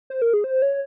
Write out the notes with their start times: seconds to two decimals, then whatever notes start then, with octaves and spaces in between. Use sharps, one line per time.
0.10 C5
0.22 A#4
0.34 G#4
0.44 C5
0.62 C#5